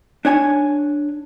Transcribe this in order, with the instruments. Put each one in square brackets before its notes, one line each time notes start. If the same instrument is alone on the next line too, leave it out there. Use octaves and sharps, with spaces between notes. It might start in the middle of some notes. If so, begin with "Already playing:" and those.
[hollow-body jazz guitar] D4 C#5 G#5